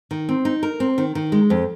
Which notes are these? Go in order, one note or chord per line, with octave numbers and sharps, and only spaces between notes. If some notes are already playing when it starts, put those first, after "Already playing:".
D#3
C4
D#4
A#4
C4
D#3
D#3
G#3
F2